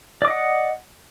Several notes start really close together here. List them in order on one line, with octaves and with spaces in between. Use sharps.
D5 D6 D#5 F#5